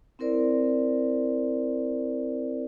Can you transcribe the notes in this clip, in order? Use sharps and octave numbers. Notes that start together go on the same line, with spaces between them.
C4 E4 A#4 C5 D5